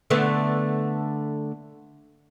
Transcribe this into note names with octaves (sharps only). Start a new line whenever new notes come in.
D3 A3 B3